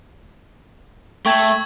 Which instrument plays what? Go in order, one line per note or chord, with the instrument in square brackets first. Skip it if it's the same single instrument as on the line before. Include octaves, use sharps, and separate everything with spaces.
[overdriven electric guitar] A3 [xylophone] G5 [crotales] C#6 G#6 F#7